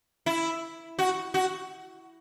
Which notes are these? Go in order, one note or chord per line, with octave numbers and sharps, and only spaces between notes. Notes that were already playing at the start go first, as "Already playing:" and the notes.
E4
F#4
F#4